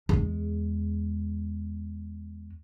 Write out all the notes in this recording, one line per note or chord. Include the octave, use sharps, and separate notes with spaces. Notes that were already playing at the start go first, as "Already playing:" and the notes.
E2 G#3